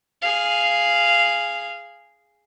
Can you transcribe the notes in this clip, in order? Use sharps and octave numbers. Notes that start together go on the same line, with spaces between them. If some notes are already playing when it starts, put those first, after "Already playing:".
G#4 F5